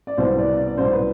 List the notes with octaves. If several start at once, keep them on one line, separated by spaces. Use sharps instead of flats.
D5
C2 B2 B3 C5
D5
D5
D5
C2 B2 B3 C5
B4